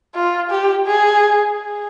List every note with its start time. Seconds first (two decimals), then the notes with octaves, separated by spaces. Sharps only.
0.15 F4
0.50 G4
0.86 G#4
1.58 G#4